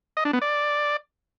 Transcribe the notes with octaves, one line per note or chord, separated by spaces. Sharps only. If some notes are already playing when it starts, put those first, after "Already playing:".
D#5
D4
B3
D5